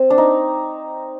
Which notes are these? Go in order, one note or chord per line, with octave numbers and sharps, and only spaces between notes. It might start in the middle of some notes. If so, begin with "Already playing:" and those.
Already playing: C4
D4
D#4